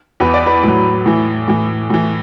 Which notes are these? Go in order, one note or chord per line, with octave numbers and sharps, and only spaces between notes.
E2 E3 B4
D5
B4
A2 F#3
A2 E3
A2 E3
A2 E3